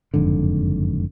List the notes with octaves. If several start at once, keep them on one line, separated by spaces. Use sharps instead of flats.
F#1 F2 G#2 D3